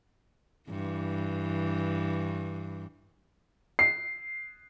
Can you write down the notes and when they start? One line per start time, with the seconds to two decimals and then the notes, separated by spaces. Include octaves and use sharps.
0.69 G2 E3
3.79 C7